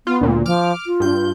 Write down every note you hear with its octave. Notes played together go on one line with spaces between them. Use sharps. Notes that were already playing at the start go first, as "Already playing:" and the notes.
B3 F4
D2 A#2
F3 D6 F6
F4
G2 G6